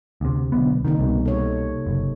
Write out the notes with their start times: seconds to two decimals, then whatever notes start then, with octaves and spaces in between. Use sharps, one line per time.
0.21 D2 C3
0.52 B1 D3 B3
0.85 C3 D#3 A#3 D#4
0.99 C2 B2
1.26 A4 C#5
1.87 F#1